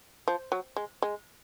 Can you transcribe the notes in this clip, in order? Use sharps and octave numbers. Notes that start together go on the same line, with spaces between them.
F3
F#3
G#3
G#3